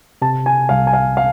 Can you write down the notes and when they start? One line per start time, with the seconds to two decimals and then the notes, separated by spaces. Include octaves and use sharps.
0.22 C3 A5
0.46 G#5
0.69 C2 F5
0.87 G#5
0.93 F5
1.17 F5